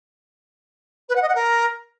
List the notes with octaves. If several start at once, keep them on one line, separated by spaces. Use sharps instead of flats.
B4
F#5
D#5
F#5
A#4